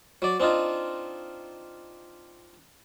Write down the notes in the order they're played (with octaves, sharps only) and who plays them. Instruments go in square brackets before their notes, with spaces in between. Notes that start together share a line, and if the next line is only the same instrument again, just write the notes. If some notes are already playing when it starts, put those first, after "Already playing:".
[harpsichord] F#3 D5
C4 D4 D#4 F4